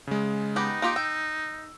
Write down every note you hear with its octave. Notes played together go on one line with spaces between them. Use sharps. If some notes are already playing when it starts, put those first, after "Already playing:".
C#3 G#3
B3 D#4 G4 B4
A#3 F4 G4
G5 E6